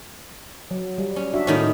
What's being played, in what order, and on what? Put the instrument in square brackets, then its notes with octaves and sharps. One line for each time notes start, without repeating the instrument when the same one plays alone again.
[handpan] F#3
G3
[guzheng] C#4
[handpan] D4 F#4 E5
[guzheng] A2 D#3 C#4